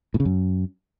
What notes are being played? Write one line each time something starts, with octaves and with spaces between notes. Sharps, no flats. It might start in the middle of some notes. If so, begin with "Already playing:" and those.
A2
C#3
F#2